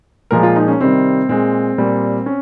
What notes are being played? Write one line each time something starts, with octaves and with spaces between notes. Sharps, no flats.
A#2 F3 G#3 A#4
F4
D#4
C#4
C3 D#3 G3 C4
A#2 G#3 C4
A#2 G3
C#4